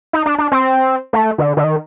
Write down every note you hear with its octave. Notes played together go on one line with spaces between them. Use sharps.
D#4
D4
D4
C4
A3
D3
D3
D#3